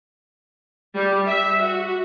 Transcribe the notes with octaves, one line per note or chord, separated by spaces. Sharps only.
G3
E5
F#4